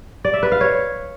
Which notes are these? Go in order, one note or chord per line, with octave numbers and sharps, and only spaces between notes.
D5
E5
B4
F5
C#5